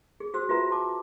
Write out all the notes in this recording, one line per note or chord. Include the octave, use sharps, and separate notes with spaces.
G#4
F#4 C5 E6
F4 F#4 B4 E5 A#5
F#4 A5 D6